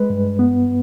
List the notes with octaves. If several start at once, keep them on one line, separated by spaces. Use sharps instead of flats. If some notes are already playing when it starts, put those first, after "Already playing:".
Already playing: G#3 B4
G2
B3